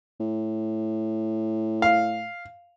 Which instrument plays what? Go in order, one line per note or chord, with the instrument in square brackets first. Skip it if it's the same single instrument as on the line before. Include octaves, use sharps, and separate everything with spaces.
[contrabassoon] A2
[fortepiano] F5